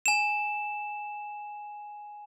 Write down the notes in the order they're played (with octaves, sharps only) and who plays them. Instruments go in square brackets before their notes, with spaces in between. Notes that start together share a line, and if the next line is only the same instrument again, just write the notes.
[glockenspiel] G#5 E7